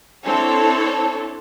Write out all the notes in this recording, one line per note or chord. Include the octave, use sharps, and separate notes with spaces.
C4 D4 E4 A4 C#5